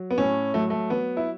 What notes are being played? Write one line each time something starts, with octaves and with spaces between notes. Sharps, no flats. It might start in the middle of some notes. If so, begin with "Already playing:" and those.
Already playing: F#3
B3
A2 C#4
F#3 A3
A3
F#3 B3
E4